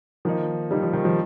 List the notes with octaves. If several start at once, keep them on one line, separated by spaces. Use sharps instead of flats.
D#3 F3 A#3 D#4
D#3 G3 A#3 D#4
F3
D#3
F3